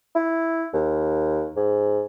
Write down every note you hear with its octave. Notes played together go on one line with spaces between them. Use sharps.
E4
D#2
G#2